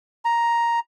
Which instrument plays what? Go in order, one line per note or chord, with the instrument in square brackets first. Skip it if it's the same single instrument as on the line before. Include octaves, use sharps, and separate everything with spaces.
[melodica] A#5